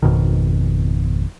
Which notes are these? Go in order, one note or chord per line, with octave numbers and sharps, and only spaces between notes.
G#1 F2 B2 D#3